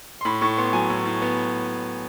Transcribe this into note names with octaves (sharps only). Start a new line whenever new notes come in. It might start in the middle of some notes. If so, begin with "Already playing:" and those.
C6
A2 B5
A2 C#6
B3 C6
F#3 G#5
A2
A2
B3